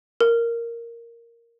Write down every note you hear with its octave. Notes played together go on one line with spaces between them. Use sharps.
A#4